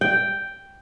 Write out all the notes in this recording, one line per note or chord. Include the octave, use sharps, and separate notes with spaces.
G5